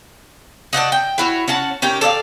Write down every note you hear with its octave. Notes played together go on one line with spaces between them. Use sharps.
D#4 F#4 A4 D5
G5
E4 F#4 C#5
C#4 F#4 F#5 A5
C#4 D#4 G4 A#4
A4 D5 D#5 F5